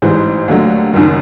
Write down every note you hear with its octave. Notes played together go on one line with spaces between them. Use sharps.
A1 G#2 E3 G3 C5
D#2 D3 F#3 A3
F#1 F#2 D#3